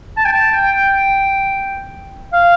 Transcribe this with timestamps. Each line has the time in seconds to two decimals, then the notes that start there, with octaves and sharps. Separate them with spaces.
0.17 A5
0.25 G5
0.31 A5
0.53 G5
2.33 F5